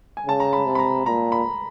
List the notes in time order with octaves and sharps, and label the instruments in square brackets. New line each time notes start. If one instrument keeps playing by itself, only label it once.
[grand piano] G#5
[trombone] C#3 [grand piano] A5
[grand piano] A#5
B5
[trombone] C3
[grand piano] B5
A#5
[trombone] A#2 [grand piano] A#5
[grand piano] B5